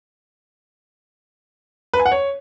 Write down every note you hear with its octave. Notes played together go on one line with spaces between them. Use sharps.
B4
G#5
F#5
C#5